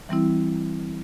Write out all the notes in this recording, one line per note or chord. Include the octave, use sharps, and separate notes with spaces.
E3 G3 C4 E4